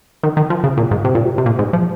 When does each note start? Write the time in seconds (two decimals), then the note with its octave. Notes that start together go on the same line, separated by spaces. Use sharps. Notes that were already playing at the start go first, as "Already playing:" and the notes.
0.23 D#3
0.37 D#3
0.50 F3
0.64 C#3
0.77 A#2
0.91 G#2
1.05 C3
1.15 A#2
1.25 C3
1.38 C3
1.46 A#2
1.59 G#2
1.73 F3